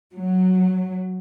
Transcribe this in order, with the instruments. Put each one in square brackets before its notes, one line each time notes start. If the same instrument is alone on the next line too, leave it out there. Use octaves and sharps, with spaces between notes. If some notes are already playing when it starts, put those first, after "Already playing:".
[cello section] F#3